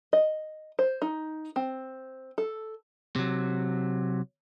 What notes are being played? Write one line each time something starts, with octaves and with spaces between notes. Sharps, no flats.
D#5
C5
D#4
C4
A4
C3 F#3